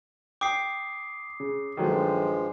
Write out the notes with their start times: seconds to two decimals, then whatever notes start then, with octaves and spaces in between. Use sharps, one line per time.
0.41 G5 D6 D#6 C7
1.40 C#3
1.77 G2 D#3 F3 F#3 G#3 A3